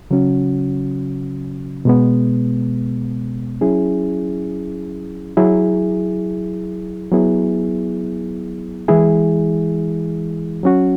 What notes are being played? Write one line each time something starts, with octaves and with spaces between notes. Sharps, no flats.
C#3 F#3 C#4 F#4
B2 G#3 B3
F#3 C#4 E4 G#4
F#3 E4 G#4
F#3 B3 E4 G#4
E3 G#3 E4 G#4
F#3 C#4 F#4